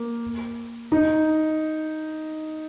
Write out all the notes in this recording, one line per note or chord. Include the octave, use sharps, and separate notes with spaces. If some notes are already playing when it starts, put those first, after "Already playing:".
Already playing: A#3
D#4